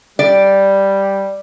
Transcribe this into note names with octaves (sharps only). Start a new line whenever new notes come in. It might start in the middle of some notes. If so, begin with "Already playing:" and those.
G3 D5